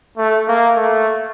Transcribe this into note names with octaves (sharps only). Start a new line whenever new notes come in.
A3
A#3
A3